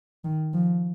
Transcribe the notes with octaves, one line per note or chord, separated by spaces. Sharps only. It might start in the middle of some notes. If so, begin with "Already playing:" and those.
D#3
F3